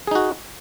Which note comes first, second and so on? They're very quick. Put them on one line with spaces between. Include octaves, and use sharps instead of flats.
G#4 D#4 F#4